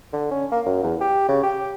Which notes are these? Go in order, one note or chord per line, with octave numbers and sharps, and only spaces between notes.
D3
C#4
A#3
F#2
E2
G4
C#3
G4